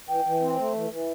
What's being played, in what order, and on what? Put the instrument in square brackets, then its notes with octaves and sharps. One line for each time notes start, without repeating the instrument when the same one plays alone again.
[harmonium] E3 [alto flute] G5
[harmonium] E3
C4
A3
E3
E3